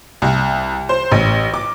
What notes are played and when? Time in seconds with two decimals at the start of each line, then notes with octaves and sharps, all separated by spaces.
0.22 C2
0.89 C5
1.11 A1
1.54 D6